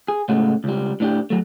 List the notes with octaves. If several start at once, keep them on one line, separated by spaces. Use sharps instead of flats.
G#4
A2 C#3 G#3 A3 F#4
C#2 G3
A2 D4 G4
F#3 A3